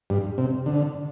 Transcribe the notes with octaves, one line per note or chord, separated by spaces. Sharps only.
G2
C3
D3